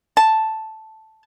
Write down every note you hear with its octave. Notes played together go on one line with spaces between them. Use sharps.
A5